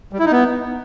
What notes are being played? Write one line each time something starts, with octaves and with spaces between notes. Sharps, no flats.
G3
E4
D#4
B3